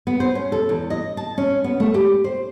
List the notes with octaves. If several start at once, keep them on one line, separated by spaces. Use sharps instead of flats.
B3
C5
C#4
A4
E2
D#5
A5
C#4
B3
A3
G4
C5